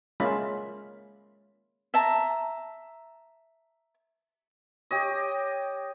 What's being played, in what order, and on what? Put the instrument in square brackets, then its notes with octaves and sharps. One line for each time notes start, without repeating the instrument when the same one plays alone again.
[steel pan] G#3 A#3 C#4 F4 E5 B5
[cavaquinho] E5 A5 A#5
[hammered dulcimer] G4 C#5 D#5